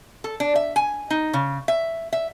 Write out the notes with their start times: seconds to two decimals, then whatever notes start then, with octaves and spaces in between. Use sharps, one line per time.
0.24 A4
0.40 D4
0.56 E5
0.76 G#5
1.10 D#4
1.33 C#3
1.68 E5
2.13 E5